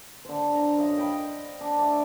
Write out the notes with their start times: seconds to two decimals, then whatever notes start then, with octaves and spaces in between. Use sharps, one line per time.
0.25 D3 C5
0.55 A#5
0.78 F#2 D#5 F5
0.96 D#5 G5 B5
1.61 D4
1.79 A3 D5